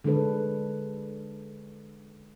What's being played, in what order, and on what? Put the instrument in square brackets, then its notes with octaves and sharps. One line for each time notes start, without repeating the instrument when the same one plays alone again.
[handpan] D3 G#3 D4 A4 B4